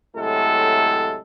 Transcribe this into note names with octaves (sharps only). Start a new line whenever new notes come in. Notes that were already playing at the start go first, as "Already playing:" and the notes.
A2 C3 F#3 G#3 A4